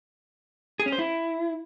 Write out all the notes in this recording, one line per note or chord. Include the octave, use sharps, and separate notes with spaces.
G#4
C#4
C5
E4